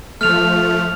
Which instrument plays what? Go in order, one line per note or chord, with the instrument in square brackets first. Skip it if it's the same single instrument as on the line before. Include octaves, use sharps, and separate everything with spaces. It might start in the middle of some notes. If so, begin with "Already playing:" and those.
[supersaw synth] F3 A3 [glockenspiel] F6 F7